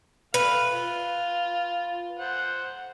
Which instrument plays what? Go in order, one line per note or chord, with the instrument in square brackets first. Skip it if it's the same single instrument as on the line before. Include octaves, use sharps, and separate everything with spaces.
[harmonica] A3 F5 [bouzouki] B4
[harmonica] F4
C5 F#5